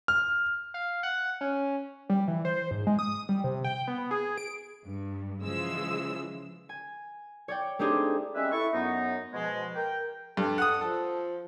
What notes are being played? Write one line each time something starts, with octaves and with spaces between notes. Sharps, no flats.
F6
F5
F#5
C#4
G3
E3
C5
G#2
G#3
D#6
G3
C3
G5
B3
G#4
D7
G2
C#3 E3 F3 G#3 E6
G#5
C#5 D5 G5
A3 C4 D4 D#4 G4 G#4
G3 G#3 C4 C#4 B4 E5
E4 A4 C#6
F#2 B3 D#4
B2 F3 G#3
A#4 G5
G2 A4
F#5 D#6
F3 A4